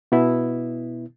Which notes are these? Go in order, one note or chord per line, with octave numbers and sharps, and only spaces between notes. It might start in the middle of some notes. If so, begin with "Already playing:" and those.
B2 B3 E4